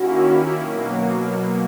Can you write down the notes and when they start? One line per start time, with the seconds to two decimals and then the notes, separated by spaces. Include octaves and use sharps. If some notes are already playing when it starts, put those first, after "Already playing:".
Already playing: D#3 A#3 C#4 E4 F#4
0.58 B2 F#3 A#3